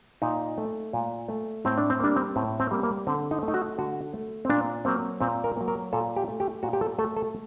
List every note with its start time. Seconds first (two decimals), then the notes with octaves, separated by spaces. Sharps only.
0.22 A#2 D#4
0.58 A3
0.93 A#2
1.28 A3
1.65 A2 C4
1.78 D4
1.90 C4
2.00 G3 A#3 D4
2.16 C4
2.36 A2 C4
2.60 C4
2.71 G3 A#3
2.83 A#3
3.07 D3 C4
3.31 D#4
3.43 A3
3.48 D#4
3.54 F#4
3.78 D3 F#4
4.13 A3
4.45 C4
4.50 A#2 D4
4.85 F#3 A#3 C4
5.20 A#2 C4
5.44 A#4
5.57 F#3 A#3
5.68 A#4
5.93 A#2 A4
6.16 G4
6.28 A3
6.40 G4
6.63 A#2 F#4
6.73 G4
6.81 A4
6.98 A3 A4
7.16 A4